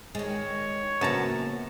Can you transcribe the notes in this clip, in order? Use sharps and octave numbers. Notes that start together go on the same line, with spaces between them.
D#3 G#3 C#5
F#2 A#2 C#3 B3 F#4 A5 A#5